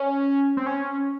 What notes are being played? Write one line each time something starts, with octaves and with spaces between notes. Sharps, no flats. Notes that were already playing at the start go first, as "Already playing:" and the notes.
Already playing: C#4
C4
C#4